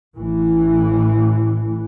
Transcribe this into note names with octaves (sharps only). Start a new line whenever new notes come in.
A1 A2 E3